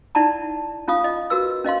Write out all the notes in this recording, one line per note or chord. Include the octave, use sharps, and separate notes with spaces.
D#4 E4 D5 F#5 A5 A#5
C#4 F4 F5 D#6
D#5
F#4 A#4 B4 E6
C#4 D#5 F5 C6